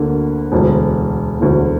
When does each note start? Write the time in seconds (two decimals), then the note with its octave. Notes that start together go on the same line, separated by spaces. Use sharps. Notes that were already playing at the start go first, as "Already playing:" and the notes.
Already playing: D2 D3 A#3
0.52 E1 D2 D3
1.40 E1 D2 D3